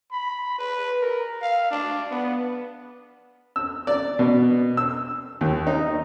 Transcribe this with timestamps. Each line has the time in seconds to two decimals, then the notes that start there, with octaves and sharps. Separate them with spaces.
0.11 B5
0.58 B4
1.02 A#4
1.42 F5
1.71 D4
2.11 B3
3.56 E6
3.87 D5
4.19 B2
4.77 E6
5.41 D#2
5.67 D#4